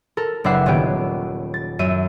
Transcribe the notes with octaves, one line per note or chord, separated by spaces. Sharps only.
A4 A#4
F#1 D4 B4 E5 F#5 C7
D#1 B3 C#4 G4 D7
A6
F#2 E5 D#7